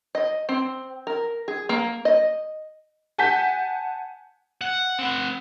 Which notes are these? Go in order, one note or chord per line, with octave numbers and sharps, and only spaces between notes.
D#5
C4
A#4
G#4
A#3
D#5
F#5 G#5 A5 G6 B6
F#5
C4 F#5